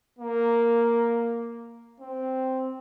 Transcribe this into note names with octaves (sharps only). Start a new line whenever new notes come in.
A#3
C4